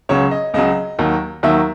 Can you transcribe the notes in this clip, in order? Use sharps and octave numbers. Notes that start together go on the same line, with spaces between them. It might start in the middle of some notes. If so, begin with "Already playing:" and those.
C#2 C#3 F#3 C#5
D#5
C#2 C#3 F#3 D#5
D#2 D#3 F#3
D#2 D#3 F#3 E5